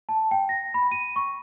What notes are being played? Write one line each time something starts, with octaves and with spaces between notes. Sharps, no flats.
A5
G5
A#6
B5
D#7
C#6